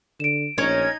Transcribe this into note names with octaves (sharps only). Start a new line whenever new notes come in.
D3 D7 E7
A#1 C#4 D#4 C#5 G#6